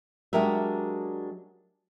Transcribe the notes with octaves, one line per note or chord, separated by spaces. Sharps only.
F#3 G#3 D4 G4 A#4 E5